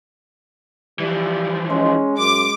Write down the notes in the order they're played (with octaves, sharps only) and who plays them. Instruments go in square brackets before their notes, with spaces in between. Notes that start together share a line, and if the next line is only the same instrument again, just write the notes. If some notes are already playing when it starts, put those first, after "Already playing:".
[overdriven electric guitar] E3 F3 [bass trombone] G3
[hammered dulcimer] G#3 [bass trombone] C#4
[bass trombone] F#2 [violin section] D6